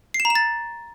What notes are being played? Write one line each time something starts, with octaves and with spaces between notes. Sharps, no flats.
C7
E7
A#5
E7
A6